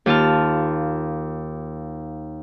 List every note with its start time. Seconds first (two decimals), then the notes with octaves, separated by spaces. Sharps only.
0.06 D#2 F4 A5 F6